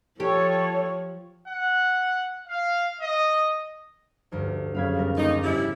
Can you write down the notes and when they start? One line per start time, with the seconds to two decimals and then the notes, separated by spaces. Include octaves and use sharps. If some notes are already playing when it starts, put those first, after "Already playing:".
0.20 F3 G4 A4 C#5
1.47 F#5
2.48 F5
3.00 D#5
4.32 F1 D2 G2
4.74 F#2 C#3 F5 B5 G#6
4.94 G3 B3 A#4
5.17 D#2 D#4 D6 A6
5.43 G#1 G3 C#4 E4 B5